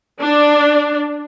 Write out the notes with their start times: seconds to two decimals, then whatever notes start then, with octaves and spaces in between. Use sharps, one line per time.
0.20 D4